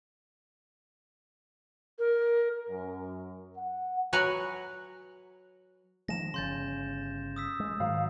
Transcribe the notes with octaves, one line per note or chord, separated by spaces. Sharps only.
A#4
F#2
F#5
F#3 B4 F#5 G#5 A#5
D#3 F3 G#3 A#6 E7
G1 C#3 C6 G6 A6
D#6 E6 B6
G#3
G#2 D#3 F#3 F5